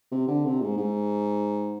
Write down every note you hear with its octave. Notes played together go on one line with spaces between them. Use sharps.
C3
D3
C3
G#2
G#2